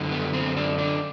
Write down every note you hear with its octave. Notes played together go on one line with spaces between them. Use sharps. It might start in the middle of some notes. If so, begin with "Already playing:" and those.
Already playing: F#2 D3
B3
C4
D4
D4